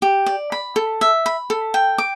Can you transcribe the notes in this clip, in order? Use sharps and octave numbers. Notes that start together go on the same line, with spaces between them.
G4
D5
B5
A4
E5
B5
A4
G5
D6